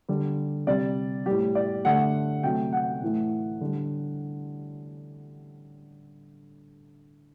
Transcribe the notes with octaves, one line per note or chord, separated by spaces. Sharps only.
D3 G3
C3 G3 D5
A2 G3 G4
D5
D3 A3 F#5
C3 F#3 A3 G5
F#5
A2 E3 A3
D3 G3